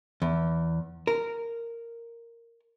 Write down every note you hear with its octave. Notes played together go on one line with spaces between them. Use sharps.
E2
A#4